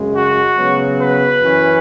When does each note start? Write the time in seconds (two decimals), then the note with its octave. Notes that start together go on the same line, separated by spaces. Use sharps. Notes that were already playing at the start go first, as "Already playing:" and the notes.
Already playing: F#2 C#3 G#3
0.15 F#4
0.57 C#3 F#3 B3
1.00 B4
1.41 F#2 E3 C#4